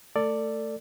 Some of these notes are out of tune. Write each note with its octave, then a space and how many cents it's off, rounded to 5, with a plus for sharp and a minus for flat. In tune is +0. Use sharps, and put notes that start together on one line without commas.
A3 +10 A4 +30 D5 +0